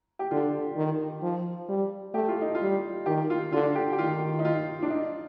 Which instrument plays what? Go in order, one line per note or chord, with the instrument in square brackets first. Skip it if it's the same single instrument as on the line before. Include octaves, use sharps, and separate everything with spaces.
[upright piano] G4
[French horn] D3 [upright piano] F4
[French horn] D#3
F3
G3
[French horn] A3 [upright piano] G4
[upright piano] F4
D#4
F4
[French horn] G3
[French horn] D#3 [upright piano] G4
[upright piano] F4
[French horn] D3 [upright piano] F4
[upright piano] G4
G4
[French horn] D#3 [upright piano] F4
[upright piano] D#4
F4
D4
D#4